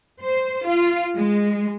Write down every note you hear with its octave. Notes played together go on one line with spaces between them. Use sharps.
C5
F4
G#3